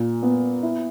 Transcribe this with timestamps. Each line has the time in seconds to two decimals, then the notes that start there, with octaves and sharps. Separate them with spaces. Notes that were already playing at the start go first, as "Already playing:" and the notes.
Already playing: A#2
0.22 B3
0.63 E4